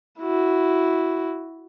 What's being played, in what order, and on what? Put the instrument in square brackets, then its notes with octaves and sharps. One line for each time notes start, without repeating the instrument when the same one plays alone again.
[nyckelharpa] E4 F#4